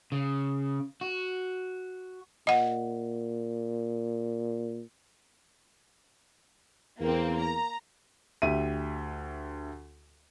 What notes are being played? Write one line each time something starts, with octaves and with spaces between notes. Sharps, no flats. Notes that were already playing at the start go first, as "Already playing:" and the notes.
C#3
F#4
A#2 D#5 F#5
E2 A#3 C4
A#5
D2 G4 E5 D#7